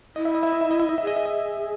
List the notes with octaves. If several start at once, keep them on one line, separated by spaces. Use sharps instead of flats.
E4 D#5
E5
D#5
E5
D#5
E5
D#5
E5
D#5
E5
G#4 D#5
E5
D#5